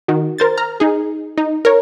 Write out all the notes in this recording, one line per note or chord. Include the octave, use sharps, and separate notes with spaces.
D#3 F#4
A#4 C5 A6
A#5 F6
D#4 G#4
D#4
A#4 C#5